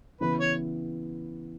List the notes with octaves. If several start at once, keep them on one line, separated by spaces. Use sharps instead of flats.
C#3 E3 B3 E4 B4
C#5